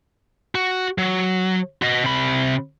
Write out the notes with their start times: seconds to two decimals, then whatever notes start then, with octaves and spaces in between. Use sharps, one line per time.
0.55 F#4
0.98 F#3
1.82 F#4 D#5
2.04 C3 B5